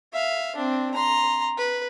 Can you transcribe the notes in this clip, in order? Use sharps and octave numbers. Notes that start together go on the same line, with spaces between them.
E5 F5
C4 D4
A#5 C6
B4